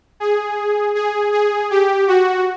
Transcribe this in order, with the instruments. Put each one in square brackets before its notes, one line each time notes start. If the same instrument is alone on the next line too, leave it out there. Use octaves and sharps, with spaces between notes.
[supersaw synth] G#4
G#4
G#4
G4
F#4